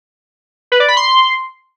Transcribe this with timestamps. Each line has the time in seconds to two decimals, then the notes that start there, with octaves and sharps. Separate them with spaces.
0.72 B4
0.80 D5
0.88 B5
0.97 C6